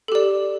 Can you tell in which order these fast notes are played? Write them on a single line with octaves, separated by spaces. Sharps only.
A4 G4 D5